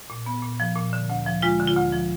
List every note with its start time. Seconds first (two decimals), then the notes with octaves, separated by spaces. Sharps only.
0.10 A#2
0.26 B3
0.43 A#2
0.60 F3
0.76 A#2
0.93 D3
1.10 D2
1.26 F3
1.42 G#3 F4
1.59 D3
1.67 F4
1.76 D2
1.92 F3